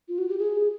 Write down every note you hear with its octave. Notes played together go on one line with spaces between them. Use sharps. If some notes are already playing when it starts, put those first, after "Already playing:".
F4
F#4
G4
G#4